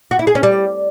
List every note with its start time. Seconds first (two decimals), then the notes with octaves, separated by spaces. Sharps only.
0.11 F#4
0.19 E4
0.27 G#4
0.35 C#4
0.43 G3